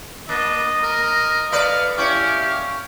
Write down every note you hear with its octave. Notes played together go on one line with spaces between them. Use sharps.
A#3 D4 D#5
A#4
A3 B4 D5 F5
C#4 E4 G4 F5